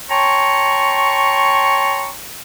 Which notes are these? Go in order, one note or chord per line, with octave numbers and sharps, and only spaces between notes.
C#5 G5 A5 A#5 C6 C#6